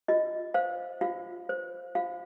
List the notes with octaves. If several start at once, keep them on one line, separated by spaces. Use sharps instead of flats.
F4 D#5
C5 F5
F4 F5
C5
F4 F5